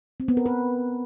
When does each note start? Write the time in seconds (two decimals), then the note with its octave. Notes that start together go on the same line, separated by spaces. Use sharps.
0.20 C4
0.28 B3
0.37 A#4
0.46 B4